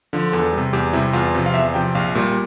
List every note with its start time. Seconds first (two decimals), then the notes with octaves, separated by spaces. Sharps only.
0.13 D3 F3
0.32 E2 A4
0.53 C3 G3
0.73 E2 G4
0.93 C3 G3 E4
1.13 E2 F4
1.34 C3 F3
1.46 F5
1.54 E2 E5
1.74 C3 F3 G5
1.95 A#1 F5
2.15 A#2 G3